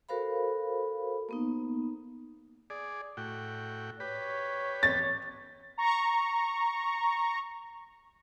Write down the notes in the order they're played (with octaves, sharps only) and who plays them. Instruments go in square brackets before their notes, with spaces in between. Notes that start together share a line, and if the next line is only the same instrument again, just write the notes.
[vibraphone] F#4 A4 A#4 C5 F5 B5
A#3 B3 D#4
[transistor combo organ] G#4 D5
A2 F#4 G5
[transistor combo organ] G4 B4 [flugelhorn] C#5
[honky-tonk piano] A6
[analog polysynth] A#5 C#6